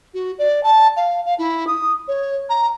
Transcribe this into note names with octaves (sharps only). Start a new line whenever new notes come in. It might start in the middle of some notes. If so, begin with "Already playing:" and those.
F#4
D5
A5
F5
F5
E4
D#6
C#5
A#5